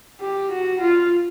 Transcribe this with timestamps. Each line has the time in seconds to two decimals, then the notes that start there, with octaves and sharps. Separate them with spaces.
0.20 G4
0.51 F#4
0.81 F4